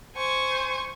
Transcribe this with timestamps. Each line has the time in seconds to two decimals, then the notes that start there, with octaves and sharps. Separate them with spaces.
0.16 C5 G#5 C#6